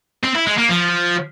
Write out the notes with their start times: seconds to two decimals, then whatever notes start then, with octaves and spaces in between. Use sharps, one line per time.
0.23 C4
0.35 E4
0.46 G#3
0.58 A#3
0.69 F3